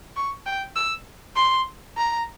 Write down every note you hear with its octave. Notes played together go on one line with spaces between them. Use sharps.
C#6
G5
E6
C6
A#5